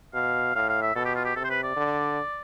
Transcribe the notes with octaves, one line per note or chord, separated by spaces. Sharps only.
B2 F5
A2 F5
F5
E5
B2 A4
G4
F4
G4
C3 A4
C5
B4
D5
D3